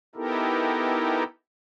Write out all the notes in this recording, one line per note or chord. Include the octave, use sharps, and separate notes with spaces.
B3 D#4 E4 G4 A4 A#4